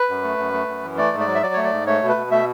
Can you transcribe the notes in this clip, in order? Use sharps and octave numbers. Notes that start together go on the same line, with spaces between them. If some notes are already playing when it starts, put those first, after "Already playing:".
Already playing: B4
F#2
A3
F#2
A3
F#2
E3
A3 D5
G#2
D5
F#3
E5
F#3 D5
A3 C#5
D5
G#2
A3 C#5
B2
B4
B2
A3 E5